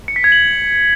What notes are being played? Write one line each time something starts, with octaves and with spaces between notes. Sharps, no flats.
C#7
B6
G#6
F#7